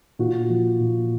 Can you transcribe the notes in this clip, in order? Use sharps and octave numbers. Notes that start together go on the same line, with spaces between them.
A#2 F#4
F3
A#2